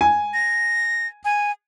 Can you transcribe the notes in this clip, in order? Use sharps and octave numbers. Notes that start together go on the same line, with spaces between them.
G#5
A#6
G#5